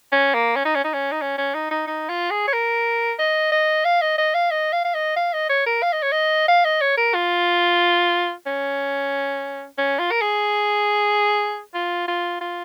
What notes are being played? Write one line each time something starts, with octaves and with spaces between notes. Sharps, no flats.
C#4
A#3
C#4
D#4
C#4
D#4
C#4
D#4
C#4
C#4
D#4
D#4
D#4
F4
G#4
C#5
A#4
D#5
D#5
F5
D#5
D#5
F5
D#5
F5
F5
D#5
F5
D#5
C#5
A#4
F5
D#5
C#5
D#5
F5
D#5
C#5
A#4
F4
C#4
C#4
F4
A#4
G#4
F4
F4
F4